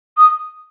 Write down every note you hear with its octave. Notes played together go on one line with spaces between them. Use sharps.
D#6